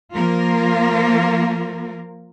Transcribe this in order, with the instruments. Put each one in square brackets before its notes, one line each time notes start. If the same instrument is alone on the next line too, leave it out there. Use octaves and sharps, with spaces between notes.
[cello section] F3 A#3 F4 A#4